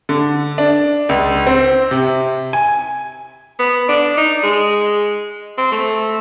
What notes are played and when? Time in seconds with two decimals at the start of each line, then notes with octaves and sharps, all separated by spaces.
0.09 D3
0.58 D4
1.09 C#2
1.47 C4
1.91 C3
2.53 G#5
3.59 B3
3.88 D4
4.17 D#4
4.43 G#3
5.58 C4
5.72 A3